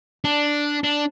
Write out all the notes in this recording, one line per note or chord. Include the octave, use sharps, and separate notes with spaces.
D4
D4